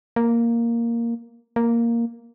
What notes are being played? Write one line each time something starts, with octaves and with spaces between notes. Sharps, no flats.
A#3
A#3